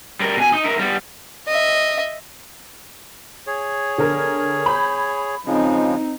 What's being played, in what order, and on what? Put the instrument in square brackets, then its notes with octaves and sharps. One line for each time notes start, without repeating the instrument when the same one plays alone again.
[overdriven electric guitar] G3 A#4
B2 G#5
D#4
E4 A#4
G3 B3
[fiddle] D#5 E5
[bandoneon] G#4 C#5
[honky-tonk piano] D3 A#4
B5 G6
[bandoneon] C#3 F3 G#3 [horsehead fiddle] C4 D#4